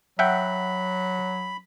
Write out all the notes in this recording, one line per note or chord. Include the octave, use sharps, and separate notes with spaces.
F#3 E5 F#5 G5 B5